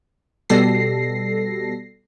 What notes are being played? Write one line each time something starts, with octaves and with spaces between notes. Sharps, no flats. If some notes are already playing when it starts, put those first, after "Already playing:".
B2 G3 A4 A#6 C7